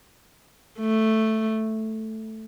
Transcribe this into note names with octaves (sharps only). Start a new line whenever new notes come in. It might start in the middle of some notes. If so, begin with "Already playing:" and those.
A3